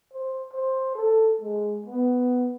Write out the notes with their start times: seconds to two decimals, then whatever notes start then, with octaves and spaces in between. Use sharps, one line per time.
0.13 C5
0.53 C5
0.95 A4
1.41 G#3
1.86 B3